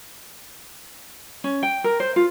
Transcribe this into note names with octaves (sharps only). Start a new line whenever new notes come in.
C#4
G5
A#4
C5
F4